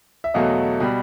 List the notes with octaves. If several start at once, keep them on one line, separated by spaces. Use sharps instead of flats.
E5
E2 B2 F#3 A3 D#5 F5
B2 G3